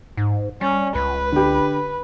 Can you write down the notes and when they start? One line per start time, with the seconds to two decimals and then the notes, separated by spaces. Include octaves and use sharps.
0.17 G#2
0.61 G3 C#4
0.95 C#2 B4
1.32 D3 G4